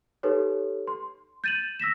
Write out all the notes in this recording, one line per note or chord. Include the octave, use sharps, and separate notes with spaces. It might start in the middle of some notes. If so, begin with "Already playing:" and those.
D#4 G4 A4 B4 C#5
C6
G6 A6 D#7 E7 F#7
E6 A#6 B6 E7